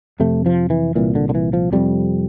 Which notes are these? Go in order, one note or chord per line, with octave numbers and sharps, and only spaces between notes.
F2 C3 A3
F3
E3
C2 A#2 E3
D3
D3
E3
F3
F2 C3 G3